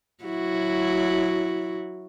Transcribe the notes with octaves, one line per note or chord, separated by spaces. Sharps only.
F#3 E4 F#4